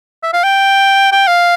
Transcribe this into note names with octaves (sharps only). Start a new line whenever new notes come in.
E5
F5
G5
G5
F5